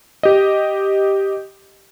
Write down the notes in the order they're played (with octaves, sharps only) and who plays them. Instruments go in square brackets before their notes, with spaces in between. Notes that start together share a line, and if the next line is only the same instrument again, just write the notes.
[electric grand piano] G4 D#5